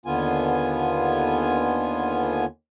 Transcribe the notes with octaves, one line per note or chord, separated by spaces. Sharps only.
D#2 D3 B3 F4 G#5